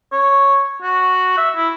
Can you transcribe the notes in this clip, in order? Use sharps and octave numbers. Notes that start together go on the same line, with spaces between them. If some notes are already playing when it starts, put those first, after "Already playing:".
C#5
F#4
E5
E4